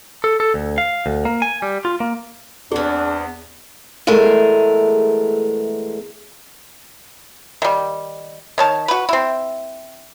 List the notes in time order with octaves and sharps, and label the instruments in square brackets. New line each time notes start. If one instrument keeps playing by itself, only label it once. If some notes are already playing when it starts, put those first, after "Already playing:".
[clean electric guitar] A4
A4
D2
F5
D2
A#3
G#5
G3
F4
A#3
[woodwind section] E2 [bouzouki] B3 C4 [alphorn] D4 [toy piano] G#4
[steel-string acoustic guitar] E2 G#3 A3 G#4 A#4
[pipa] D#3 G3
D#3 C#5 A5
F#4 B4
C4 E4